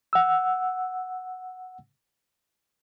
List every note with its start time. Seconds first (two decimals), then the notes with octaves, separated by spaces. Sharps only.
0.13 F#5 E6